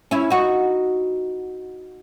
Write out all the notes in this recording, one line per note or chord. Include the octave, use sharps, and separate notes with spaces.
C#4 E4
D#4 F#4